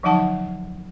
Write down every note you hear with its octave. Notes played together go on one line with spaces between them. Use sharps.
D3 F3 F#3 D#4 F#5 A5